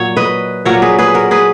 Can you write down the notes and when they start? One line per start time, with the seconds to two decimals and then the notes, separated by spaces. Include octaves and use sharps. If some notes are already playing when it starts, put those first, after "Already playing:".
Already playing: A#2 F#3 C#5
0.17 B4 D#5
0.65 A#2 F#3 A#4 C#5
0.82 G#4 B4
0.99 G#4 B4
1.14 F#4 A#4
1.31 G#4 B4